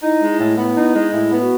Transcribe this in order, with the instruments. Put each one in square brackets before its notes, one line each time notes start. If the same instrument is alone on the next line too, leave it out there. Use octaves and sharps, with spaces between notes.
[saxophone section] D#4 [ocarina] E4
[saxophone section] G#3
[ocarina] E4
[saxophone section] A2
[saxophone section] B3 [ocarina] E4
[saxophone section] D#4
G#3
[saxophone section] A2 [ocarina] E4
[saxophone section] B3
[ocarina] F#4